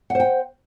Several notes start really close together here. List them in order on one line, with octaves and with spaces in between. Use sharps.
F#5 C5 G5